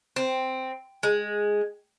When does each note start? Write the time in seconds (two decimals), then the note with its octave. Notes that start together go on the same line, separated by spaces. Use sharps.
0.16 C4
1.03 G#3